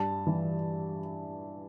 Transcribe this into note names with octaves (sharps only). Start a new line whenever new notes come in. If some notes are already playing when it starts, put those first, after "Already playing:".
Already playing: G2 A5
E3